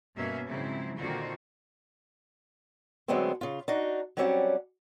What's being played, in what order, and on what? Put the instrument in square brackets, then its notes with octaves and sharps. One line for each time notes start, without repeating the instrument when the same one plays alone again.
[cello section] G2 B2 A#3 C#4 E5
G#2 C#3 F3 F#3 C4 E4
A#2 D3 D#3 C4 F4 F#4
[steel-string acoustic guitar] D3 F#3 G#3 A3 B3 C4
C#3 F4
D4 D#4 F#4
F#3 G3 C4 C#4 D5 F#5